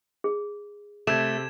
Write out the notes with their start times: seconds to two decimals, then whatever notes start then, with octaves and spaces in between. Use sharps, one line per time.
0.24 G#4
1.07 C3 A3 G#6 E7